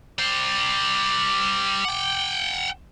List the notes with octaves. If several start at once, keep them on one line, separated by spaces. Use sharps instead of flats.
G3 C5 D6
F#5 G5